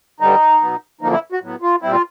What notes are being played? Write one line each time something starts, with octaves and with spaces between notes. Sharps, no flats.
G2 D3 G3 D#4
B2 F#3 B3
F#2 D3 F3 A#3 D#4
E4
F#4
A2 F#3 B3
F4
A#2 G3 C4 E4
F4